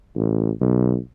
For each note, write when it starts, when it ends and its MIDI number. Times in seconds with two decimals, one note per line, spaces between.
0.15 0.51 33
0.61 0.97 35